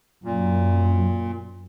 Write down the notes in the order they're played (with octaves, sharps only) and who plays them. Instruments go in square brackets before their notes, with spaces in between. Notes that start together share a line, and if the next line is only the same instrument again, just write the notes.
[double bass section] F#2 [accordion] A#2